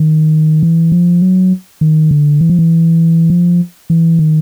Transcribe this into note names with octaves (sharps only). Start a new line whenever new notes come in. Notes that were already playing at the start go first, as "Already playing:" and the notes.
Already playing: D#3
E3
F3
F#3
D#3
D3
E3
F3
E3
F3
E3
D#3